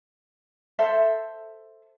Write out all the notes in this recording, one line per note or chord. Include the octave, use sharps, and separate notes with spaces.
A4 C5 E5